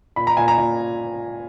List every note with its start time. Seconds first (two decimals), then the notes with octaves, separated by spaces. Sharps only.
0.16 A#2 B5
0.27 A#5
0.37 A#2 G#5
0.48 A#5
0.58 A#2